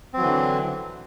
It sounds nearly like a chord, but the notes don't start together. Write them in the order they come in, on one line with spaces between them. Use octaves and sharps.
C4 F#3 E3 D3